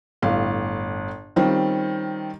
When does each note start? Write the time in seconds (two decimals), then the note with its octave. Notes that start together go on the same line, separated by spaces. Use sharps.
0.22 G1 A2 F5
1.36 D#3 G3 C4 C#4 F4